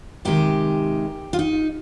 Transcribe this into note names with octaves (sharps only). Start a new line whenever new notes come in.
C3 D#3 G#3 G4
F4
D#4